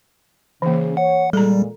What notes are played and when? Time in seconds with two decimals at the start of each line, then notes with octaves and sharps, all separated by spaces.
0.62 C#3 E3 A#3
0.97 C#5 F#5
1.33 A#2 G3 G#3 A4 A#5